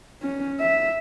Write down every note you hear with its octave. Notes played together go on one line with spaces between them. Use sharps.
C#4
E5